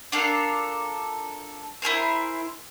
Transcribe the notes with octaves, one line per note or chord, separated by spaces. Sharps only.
D4 F4 A4 A#4
E4 G#4 A#4 C5